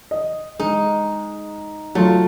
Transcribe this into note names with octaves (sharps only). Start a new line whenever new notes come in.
D#5
G#3 D#4
F#3 A3 F4